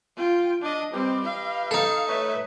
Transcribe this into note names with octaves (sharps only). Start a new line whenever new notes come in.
F4 G5
D4 D#5
G3 C4 G4 B4 D#5
F5
D#4 A4
A3 B4 C#5 E5